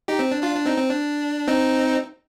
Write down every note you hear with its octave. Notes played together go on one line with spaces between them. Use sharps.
D#4 G4
C4
D4
D4 F4
D4
C4 D#4
C4
D4
C4 D#4